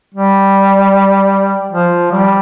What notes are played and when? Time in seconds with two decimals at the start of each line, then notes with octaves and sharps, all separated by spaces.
0.14 G3
1.72 F3
2.11 G3